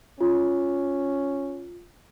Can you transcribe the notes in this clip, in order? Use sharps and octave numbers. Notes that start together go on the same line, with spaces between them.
C#4 F4